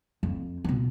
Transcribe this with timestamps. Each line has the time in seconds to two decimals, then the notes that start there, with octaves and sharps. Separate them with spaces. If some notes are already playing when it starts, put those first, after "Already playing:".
0.23 F2
0.65 B2 B3